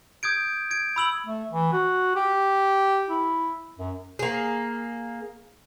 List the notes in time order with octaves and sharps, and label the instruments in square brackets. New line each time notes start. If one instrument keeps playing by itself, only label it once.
[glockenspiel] D#6 G6 G#6 D7
G#6 D7
B5 E6 F#7
[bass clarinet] A3
E3
F#4
G4
E4
F#2
[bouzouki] A#3 G#4